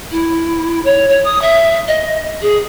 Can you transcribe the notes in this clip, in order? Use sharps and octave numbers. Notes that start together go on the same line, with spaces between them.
E4
C#5
C#5
D#6
E5
D#5
G#4